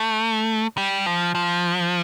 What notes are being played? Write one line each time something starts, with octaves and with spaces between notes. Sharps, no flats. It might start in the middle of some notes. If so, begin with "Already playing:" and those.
Already playing: A3
G3
F3
F3